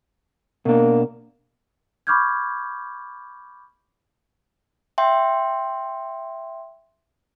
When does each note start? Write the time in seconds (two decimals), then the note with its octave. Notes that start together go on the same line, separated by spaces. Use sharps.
0.66 B2 A#3 D4
2.07 B5 C#6 D6 F6 G6 G#6
4.98 E5 G5 C6